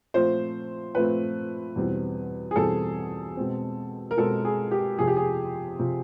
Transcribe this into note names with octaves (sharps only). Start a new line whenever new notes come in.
A#2 F3 A3 C4 C5
A#2 F3 A3 C4 B4
E2 B2 G3 C4
G#4
E2 B2 G3 C4 A4
B2 G#3 C4
A#4
B2 G#3 C4 A4
G#4
G4
F2 C3 F3 G#4
G4
G#4
C3 F3